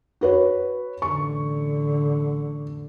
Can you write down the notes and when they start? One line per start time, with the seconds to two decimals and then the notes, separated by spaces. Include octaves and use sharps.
0.21 F#4 B4 C#5
1.02 A1 D3 C#6